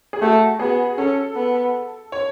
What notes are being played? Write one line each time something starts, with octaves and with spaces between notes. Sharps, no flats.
G#4
A3 F#4
B3 G#4
C#4 A4
B3
C#5